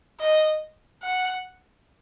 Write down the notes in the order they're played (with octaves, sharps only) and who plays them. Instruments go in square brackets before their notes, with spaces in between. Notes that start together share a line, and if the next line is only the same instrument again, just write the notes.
[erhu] D#5
F#5